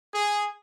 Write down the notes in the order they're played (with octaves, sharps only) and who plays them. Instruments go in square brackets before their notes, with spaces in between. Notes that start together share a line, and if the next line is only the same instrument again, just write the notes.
[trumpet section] G#4